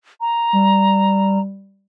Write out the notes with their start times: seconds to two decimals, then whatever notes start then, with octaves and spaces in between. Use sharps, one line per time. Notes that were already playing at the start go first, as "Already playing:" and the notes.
0.21 A#5
0.53 G3